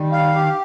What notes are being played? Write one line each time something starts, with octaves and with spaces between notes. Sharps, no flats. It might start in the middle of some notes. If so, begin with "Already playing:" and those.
Already playing: D#3 G3
F5
G4